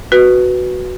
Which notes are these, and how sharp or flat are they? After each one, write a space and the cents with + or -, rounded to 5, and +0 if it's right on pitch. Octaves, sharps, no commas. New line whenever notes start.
F#4 +0 B4 +0